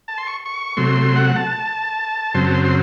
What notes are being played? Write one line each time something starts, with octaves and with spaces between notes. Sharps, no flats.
A5
C6
C#6
C#6
C3 F#3 A3 C6
F#5
A5
F#2 C#3 F#3 C4 C6
A5
C6
C6